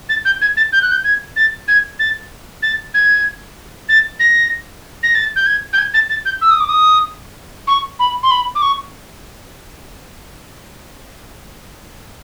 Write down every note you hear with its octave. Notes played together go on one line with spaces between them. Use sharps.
A6
G6
G#6
A6
G6
F#6
G6
G#6
A6
G#6
A6
A6
G#6
A6
A#6
A#6
A6
G6
G#6
G6
G#6
A6
A6
G6
E6
D#6
D6
D#6
C#6
B5
C6
B5
D6
C#6